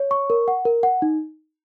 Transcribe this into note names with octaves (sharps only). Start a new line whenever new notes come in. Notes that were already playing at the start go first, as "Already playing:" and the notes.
Already playing: C#5
C#6
A#4
F#5
A#4
F#5
D#4